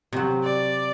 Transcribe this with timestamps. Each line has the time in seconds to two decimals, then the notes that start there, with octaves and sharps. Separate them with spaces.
0.13 C3 F#3
0.43 D5